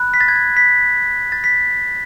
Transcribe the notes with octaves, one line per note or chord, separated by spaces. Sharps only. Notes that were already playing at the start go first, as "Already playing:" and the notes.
Already playing: B5 F#6
B6
A6
G#6
A6
B6
A6
B6